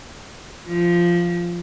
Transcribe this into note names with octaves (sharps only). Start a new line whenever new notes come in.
F3